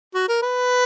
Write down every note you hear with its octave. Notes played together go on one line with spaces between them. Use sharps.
F#4
A#4
B4